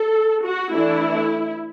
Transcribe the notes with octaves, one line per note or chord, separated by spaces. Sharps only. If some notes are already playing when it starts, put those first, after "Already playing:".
Already playing: A4
F#4
E3 A3 D4 E4